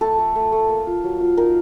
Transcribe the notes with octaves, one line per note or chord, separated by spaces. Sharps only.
A3 A4
A3
A3
A3
A#3
F4
F#3
F4
D#4 A#4